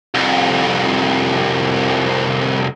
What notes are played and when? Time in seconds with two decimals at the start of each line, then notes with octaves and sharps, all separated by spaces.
0.14 C2 F2